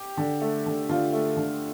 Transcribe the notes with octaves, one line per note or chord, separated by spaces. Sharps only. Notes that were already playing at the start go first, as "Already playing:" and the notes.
Already playing: G4
D3
A3
D3
D3 F4
A3
D3